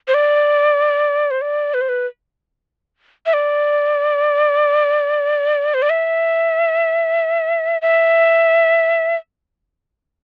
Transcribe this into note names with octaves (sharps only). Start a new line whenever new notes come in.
C5
D5
C5
D5
B4
C5
B4
E5
D5
C5
D5
E5
E5